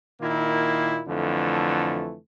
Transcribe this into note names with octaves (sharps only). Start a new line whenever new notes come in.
A#2 D#3 A#3 E4
F2 D3 E3 A3